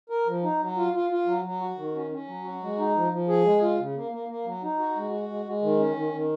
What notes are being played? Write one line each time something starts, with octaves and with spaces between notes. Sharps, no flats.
A#4
F3
D#4
F#3
F4
F4
F4
F#3
F#3
F#4
D#3
C#4
C#4
F#3
F#4
G#3
D#4
F3
F3
G#4
G#3
F4
C#3
A#3
A#3
A#3
F#3
D#4
F#4
G#3
F#4
G#3
G#3
D#3
C#4
D#3
D#3